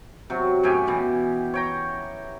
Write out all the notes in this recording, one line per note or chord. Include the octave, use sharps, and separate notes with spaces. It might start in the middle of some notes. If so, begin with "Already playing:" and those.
C3 F#3
F#2 A2 G4 G#5
B2 E3
C#5 G5 A#5